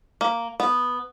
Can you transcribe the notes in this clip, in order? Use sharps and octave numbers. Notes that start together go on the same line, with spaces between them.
A#3
B3